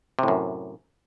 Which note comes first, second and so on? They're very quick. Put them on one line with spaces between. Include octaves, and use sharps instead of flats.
C3 A2 F#2